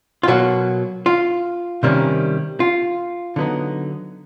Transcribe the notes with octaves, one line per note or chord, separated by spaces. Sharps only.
F4
B2 F#3 A#3 F#4
F4
C3 D#3 G3 A#3 C#4
F4
D3 F#3 B3 D#4